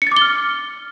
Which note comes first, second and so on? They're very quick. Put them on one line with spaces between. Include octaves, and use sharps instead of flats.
C#7 A6 D6 G7 F6